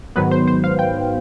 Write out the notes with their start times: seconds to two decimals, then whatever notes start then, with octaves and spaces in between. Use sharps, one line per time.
0.16 G#2 D#3 F#3 B3 B4
0.31 C5
0.48 C5
0.64 F5
0.79 G5